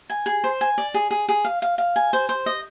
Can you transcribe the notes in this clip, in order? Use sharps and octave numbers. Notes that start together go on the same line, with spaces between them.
G#5
G#4
C5
G#5
D5
G#4
G#4
G#4
F5
F5
F5
G#5
C5
C5
D#5